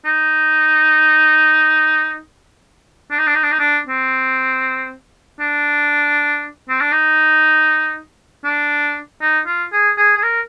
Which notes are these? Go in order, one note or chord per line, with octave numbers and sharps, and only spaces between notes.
D#4
D4
D#4
D4
D#4
D4
D#4
D4
C4
D4
C4
D4
D#4
D4
D#4
F4
G#4
G#4
G#4
A#4